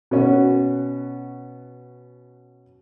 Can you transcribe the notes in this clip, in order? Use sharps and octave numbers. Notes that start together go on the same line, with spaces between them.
B2 C#4 F#4